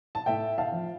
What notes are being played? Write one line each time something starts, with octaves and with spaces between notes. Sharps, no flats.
A5
A2 E5 G5
F5 A5
F3